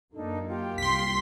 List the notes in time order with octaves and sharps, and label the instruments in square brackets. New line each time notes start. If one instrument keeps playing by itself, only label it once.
[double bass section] F#2 A#3 [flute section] D4 D#4 A4
[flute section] F4 G4
[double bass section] C2 [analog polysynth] C6 B6